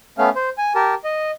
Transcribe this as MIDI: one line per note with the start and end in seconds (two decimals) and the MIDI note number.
0.18 0.29 57
0.18 0.29 59
0.18 0.29 61
0.18 0.29 77
0.36 0.49 72
0.58 0.73 80
0.75 0.94 67
0.75 0.94 70
0.75 0.94 81
1.04 1.31 75